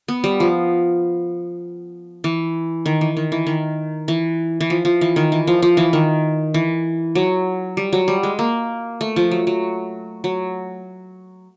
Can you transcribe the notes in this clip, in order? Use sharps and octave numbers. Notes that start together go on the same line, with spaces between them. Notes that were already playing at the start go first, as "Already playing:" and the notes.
B3
G3
F3
E3
D#3
E3
D#3
E3
D#3
E3
E3
F3
F3
E3
D#3
E3
F3
F3
E3
D#3
E3
F#3
G3
F#3
G3
G#3
A#3
A3
F3
F#3
F#3
F#3